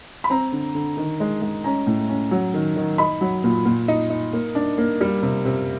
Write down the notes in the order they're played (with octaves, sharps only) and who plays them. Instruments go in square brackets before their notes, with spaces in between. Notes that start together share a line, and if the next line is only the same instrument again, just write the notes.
[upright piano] B5
C4 A#5
D3
D3
D#3
G#3
G#3
C#4 A#5
A2
C#4
F#3
D#3
D#3
D#4 B5
F#3
A#2
A#2
D#4
D#4
A#3
D4
A#3
G3
C3
C3